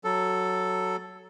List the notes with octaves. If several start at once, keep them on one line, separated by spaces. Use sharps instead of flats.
F#3 A4